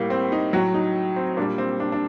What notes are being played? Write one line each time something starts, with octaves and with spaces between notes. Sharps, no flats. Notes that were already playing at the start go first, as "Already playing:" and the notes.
Already playing: A2 G3 A#3
C4
D#4
A2 F#3 F#4
D#4
C4
A#2 G3 D4
C4
D4
D4